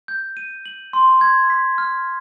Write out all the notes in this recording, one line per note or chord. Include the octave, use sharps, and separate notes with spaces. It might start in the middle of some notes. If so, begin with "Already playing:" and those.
G6
D#7
F#7
C6
G#6
B6
F6